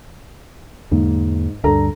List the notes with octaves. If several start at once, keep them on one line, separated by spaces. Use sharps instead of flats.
E2 G#2 D3 A#3
D2 G2 D4 A4 A#5